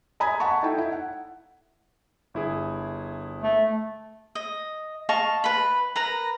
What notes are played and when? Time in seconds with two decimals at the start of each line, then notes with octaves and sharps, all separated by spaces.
0.20 D#5 G#5 A#5 B5 D#6 G#6
0.40 F#5 A5 B5 C#6
0.63 D#4 E4 A4 G5
0.78 E4
0.92 F#5
2.34 G1 E4 G#4
3.42 A3
4.35 D#5
5.09 D#5 F5 A5 C#6
5.44 B4 B5
5.96 A#4 B4 A#5